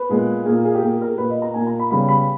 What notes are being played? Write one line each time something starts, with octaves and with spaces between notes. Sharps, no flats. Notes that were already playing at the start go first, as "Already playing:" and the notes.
Already playing: B4
A#2 G#3 B3
A#2 A#3 G#4
G#4
G4
A#2 A#3 G#4
G4
A#4
G#4
A#2 A#3 B4
D#5
A#5
A#2 A#3 G#5
A#5
B5
C#3 G3 B3 B5
B5